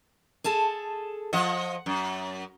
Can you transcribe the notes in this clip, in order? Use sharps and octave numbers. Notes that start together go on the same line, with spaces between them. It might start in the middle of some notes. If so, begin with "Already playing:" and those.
G#4 A4 A5
F3 D#5 F#5
F#2